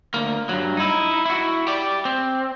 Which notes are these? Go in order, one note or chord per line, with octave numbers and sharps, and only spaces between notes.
D2 A#3
G2 F#3
D#4 E4
E4 F#4
G4 D5
C4